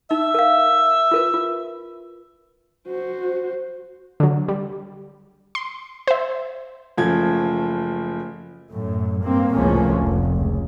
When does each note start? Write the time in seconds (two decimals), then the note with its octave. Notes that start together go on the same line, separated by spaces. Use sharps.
0.11 D#4 E5
0.34 A#4 F5
1.11 F4 A#4 B4
1.34 F4
2.87 F#4 C5
4.20 D3 F#3
4.48 G3
5.55 C6
6.07 C5 E5
6.98 F#1 F3 A3 G#6
8.71 F#2 A2
9.23 G2 A#3 C4
9.52 F1 C#2 A2 F3 A#3 C#4
10.00 F1
10.36 C#2